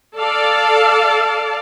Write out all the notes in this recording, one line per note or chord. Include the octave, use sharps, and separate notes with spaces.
A4 D5 F5 A5